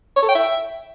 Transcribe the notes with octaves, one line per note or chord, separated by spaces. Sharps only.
C#5
A4
G5
E5